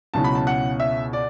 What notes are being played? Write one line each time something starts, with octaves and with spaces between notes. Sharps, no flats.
C#2 B2 F#3 C#4 E4 A5
B5
A5
F#5
E5
D5